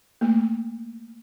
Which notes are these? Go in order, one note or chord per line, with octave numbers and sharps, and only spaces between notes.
A3 A#3